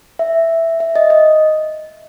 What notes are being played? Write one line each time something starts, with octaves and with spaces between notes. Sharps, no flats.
E5
E5
D#5
D#5